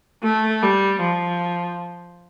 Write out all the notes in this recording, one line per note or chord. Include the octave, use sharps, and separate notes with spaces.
A3
G3
F3